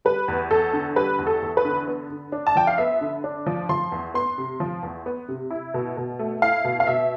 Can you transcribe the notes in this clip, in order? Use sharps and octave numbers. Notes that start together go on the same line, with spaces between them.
G3 B4
E2
E2 A4
D3
G3 B4
E2
A4
E2
B4
D3
B3
D3
D4
A5
F3 G5
F5
B3 E5
D3
D4
F3
F3 C6
E2
B3 C6
C3
F3
E2
B3
C3
E4
B2
B2
A3
E4 F5
B2
F5
B2 E5